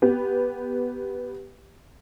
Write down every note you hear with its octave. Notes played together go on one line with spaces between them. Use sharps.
B3 G4